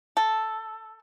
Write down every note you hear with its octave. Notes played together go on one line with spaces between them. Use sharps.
A4